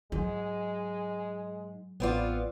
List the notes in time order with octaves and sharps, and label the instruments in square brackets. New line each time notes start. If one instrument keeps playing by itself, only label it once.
[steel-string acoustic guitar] G#2 [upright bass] F#3 [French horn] G#3
[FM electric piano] A1 B4 D5 [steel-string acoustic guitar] B3 C4 F4